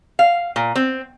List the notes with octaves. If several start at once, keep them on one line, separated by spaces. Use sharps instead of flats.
F5
A#2
C4